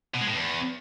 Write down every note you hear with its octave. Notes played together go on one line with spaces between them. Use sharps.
B2
G#3
A2
E2